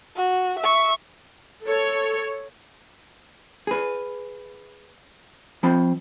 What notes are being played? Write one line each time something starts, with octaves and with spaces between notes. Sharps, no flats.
F#4
E5 C#6
A4 C#5
G#4 B4
F3 C4 C5 B5